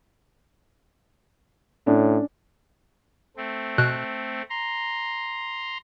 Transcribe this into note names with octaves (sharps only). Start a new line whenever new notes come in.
A2 C#4 D4
A3 C4
B2 F#6
A#5 C6